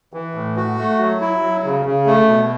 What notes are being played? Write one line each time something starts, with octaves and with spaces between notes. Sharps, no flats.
E3
A2
F#4
A3
F#3
E4
F#3
C#3
C#3
A3
B2